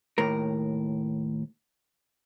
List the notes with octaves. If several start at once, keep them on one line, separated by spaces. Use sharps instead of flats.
D#2 A2 A#4